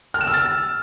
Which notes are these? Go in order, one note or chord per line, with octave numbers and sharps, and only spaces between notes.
F6
E7
E6
A6